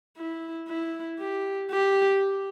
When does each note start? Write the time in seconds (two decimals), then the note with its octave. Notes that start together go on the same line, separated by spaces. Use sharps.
0.17 E4
0.68 E4
1.19 G4
1.71 G4